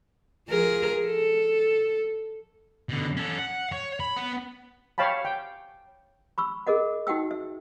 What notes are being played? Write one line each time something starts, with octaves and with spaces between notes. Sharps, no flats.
F3 G#4 A#4
A4
B2 D3
C#4 A4
F#5
C#5
B5
B3
C#5 F5 G5 A5 B5
G5
B5 C#6 E6
G#4 A#4 D#5 F#5
D#4 F#4 F#5 G5 E6
E5